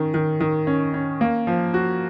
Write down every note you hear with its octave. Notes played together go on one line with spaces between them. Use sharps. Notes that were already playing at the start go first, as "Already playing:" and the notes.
Already playing: D#3 C#4
D#3
D#3
C#4
C#4
A#3
F3
F#4